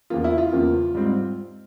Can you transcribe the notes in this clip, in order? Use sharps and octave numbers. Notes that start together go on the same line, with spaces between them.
E2 C#3 F3 A#3 F4
E4
F4
E2 C#3 F3 A#3
G#2 G3 C4